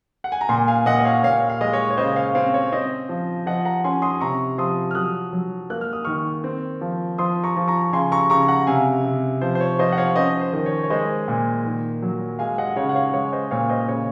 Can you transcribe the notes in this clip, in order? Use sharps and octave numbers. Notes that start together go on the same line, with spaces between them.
F#5
G#5
A#5
A#2 G#5 C6
F5 G#5
A#2 D#5 F#5
D#5
C#5 F5
A#2 C#5 F5
F5
G#3 D#5
C#5
C#5
C#3 C5 D#5
C#5 F5
C4 C#5 F5
C#5
C4 C5 D#5
F3
F3 D#5 F#5
F#5 A#5
C#4 G#5 C6
C6 D#6
C3 A#5 C#6
F3 C6 D#6
F6
F#3 D#6 F#6
F#3
A#3 F#6
F6
D#6
D#3 C#6 F6
C4
F3
F3 C6 D#6
A#5 C#6
F3
A#5 C#6
C#3 G#5 C6
A#5 C#6
C#3 A#5 C#6
F#5 A#5
C3 F5 G#5
C3
F3 C5
C5
C#5
F3 C5 D#5
F#5
C#5 F5
C#4 C5 D#5
C5
D#3
C#5
C#5
G#3 C5 D#5
A#2
D#3
F#3
G#3 F5 G#5
D#5 F#5
C#3 C#5 F5
F#5
C#5 F5
G#3 C#5
C5 D#5
A#2 C#5 F5
C5 D#5
C#3 C#5